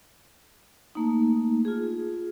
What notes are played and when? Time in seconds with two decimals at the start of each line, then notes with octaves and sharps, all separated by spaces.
0.95 A3 A#3 D#4
1.65 F4 G#4